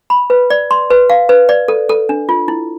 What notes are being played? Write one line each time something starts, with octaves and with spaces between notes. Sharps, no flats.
B5
B4
D5
C6
B4
F5
B4
D5
A4
A4
D4
F4
E4